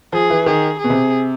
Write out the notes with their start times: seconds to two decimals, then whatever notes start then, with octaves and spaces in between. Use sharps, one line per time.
0.13 F3 G#4
0.30 E3
0.46 D#3 G#4
0.79 G#4
0.84 B2
0.90 C3